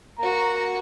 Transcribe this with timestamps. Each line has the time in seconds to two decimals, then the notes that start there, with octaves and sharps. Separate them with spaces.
0.18 A#3 F#4 A#5